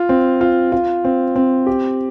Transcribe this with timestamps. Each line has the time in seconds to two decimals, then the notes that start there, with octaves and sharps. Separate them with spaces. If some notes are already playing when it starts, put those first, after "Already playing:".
Already playing: F4
0.09 C4
0.41 F4
0.72 F4
1.04 C4
1.36 C4
1.67 G4